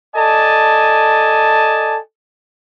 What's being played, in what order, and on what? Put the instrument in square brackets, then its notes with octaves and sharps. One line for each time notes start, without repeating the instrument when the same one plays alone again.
[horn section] A4 D5 D#5 G#5 A5